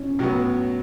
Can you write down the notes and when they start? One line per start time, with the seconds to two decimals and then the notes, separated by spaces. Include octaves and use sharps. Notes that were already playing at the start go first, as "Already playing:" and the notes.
Already playing: C#4
0.19 A2 F#3 B3